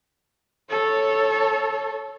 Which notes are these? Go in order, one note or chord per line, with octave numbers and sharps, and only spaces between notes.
A4 C#5